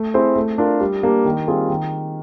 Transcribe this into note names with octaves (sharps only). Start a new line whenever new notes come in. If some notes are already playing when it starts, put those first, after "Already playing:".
Already playing: A3
C4 E4 G#4 C5
A3
D4 F4 A#4
G3
A#3 D4 G4
D#3
G3 C4 F4 G#4
D#3